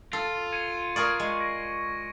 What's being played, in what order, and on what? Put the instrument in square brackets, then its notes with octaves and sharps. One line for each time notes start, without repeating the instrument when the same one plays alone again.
[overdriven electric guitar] F4 [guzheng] A4
[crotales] G#6 C#7 D#7
[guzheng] G#4 A#4 D5 [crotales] C#6
[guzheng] G#3
[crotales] A#6 D7